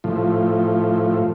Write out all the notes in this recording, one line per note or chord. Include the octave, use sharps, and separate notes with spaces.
A2 F3